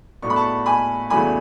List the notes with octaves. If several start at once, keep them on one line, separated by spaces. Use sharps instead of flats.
A2 F#3 B3 D4 C#6
B5
A5 C#6
G#5 B5
E2 C#3 F#3 A3 D4 G#5 B5